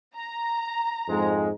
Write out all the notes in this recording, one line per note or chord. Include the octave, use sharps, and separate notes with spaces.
A#5
F2 G#2 G#3